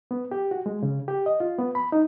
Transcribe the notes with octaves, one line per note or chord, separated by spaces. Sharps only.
B3
G4
F#4
G#3
C#3
G4
D#5
F4
B3
B5
D#4